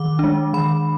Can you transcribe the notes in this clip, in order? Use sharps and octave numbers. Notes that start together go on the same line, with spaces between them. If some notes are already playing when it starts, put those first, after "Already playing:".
Already playing: D#3 D6
G#3 D4
D#3 B5